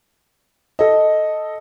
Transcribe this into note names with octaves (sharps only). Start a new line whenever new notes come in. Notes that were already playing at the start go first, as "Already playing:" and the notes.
A4 D#5